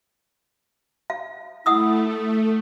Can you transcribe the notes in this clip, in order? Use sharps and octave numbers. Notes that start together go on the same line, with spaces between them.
F5
A3 E4 F#5 D#6 E6
A4